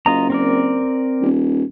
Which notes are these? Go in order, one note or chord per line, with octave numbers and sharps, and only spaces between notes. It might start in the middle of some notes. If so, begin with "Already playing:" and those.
F#1 F4 D#5 A#5
C4 A#4 D5
D#1